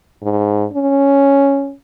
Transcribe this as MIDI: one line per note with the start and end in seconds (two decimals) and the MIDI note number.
0.23 0.65 44
0.73 1.73 61